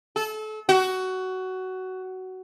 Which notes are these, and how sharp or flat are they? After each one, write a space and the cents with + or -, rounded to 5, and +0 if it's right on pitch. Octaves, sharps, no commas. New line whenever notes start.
A4 -30
F#4 +15